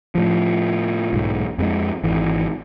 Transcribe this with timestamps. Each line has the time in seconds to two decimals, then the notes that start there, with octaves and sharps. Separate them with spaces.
0.15 A2 F3
1.13 B1 G#2
1.58 F2 G3 G#3
2.04 G#1 E3